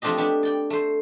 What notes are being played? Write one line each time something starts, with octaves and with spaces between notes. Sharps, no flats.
F3 A3 C4 D4 G4 D#5
B3 D4 G4
D5 G5
A3 C5